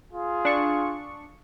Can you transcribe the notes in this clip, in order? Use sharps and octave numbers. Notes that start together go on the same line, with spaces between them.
F4 G#4
D4 C#6